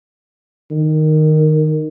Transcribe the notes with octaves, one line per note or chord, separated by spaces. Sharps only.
D#3